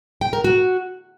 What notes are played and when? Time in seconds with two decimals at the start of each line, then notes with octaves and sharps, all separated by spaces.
0.21 G5
0.33 A#4
0.44 F#4